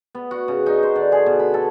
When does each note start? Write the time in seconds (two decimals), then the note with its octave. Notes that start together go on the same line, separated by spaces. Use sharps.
0.15 B3
0.31 F#4
0.48 C#3
0.66 D#4
0.83 C5
0.96 D3
1.12 G#4
1.26 B2
1.40 B5
1.54 A4